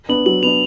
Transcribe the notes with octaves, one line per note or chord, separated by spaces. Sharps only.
B3 D4 F#7
F#3 F#7
B3 D4 F7